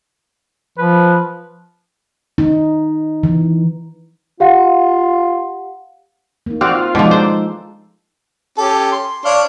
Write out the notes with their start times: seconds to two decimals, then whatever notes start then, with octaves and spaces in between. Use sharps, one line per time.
0.78 F3 B4
2.38 D#4
3.23 E3
4.40 F4 G4 F5 F#5
6.46 A#3 D#4
6.61 C4 F#4 D5 F5
6.75 F4
6.95 B2 F3 G#3 D4 D#4 A4
7.11 C5
8.58 C#4 G4 A4
8.92 C6
9.25 D4 C#5 F5